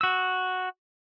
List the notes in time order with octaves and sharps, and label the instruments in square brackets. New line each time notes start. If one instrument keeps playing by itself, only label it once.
[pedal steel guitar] F#4 E6